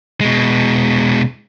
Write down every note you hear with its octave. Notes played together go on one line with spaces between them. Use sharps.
B2 G#3